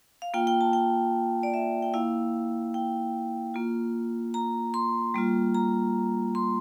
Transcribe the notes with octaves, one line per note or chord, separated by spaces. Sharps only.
F5
A#3 F4 G5
G5
A5
G5
D5
E5
G5
A#3 E4 F5
G5
A#3 F4
A#5
C6
G3 A#3 F4
A#5
C6